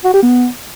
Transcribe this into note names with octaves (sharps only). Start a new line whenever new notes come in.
F#4
G4
B3